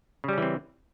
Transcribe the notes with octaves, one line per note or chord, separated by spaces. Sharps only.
C#3 E3 G3 C4 C#4